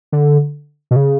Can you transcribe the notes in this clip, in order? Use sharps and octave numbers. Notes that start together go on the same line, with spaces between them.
D3
B2
C#3